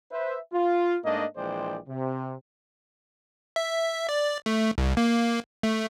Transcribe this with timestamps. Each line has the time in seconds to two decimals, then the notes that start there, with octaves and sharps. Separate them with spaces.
0.11 B4 C5 E5
0.53 F4
1.04 G#2 A3 A#3 D4 D#5
1.37 A#1 E3 G#3 C5 D5 G5
1.88 C3
3.56 E5
4.09 D5
4.46 A3
4.78 C2
4.97 A#3
5.63 A3